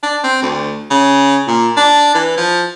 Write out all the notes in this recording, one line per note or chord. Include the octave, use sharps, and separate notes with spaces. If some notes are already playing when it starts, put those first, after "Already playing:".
D4
C4
D2
C#3
A#2
D4
E3
F3